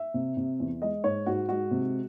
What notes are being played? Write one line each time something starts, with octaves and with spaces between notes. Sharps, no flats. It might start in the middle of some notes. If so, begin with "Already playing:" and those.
Already playing: E5
C3
C3
E2
G#3 D#5
G#2 C#5
G#2 F#4
G#3 F#4
C3